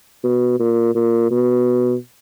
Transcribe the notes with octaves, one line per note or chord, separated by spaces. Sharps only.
B2
A#2
A#2
B2